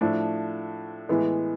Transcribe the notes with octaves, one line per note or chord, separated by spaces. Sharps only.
A2 F3 A3 D4
A2 E3 G#3 B3